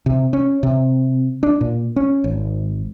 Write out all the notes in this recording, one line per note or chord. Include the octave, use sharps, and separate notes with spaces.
C3
C#4
C3
D4
A#2
C#4
G#1